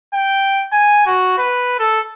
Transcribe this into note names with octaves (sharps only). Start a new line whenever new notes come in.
G5
G#5
F#4
B4
A4